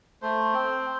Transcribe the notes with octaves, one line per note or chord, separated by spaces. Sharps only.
A3 C5
C4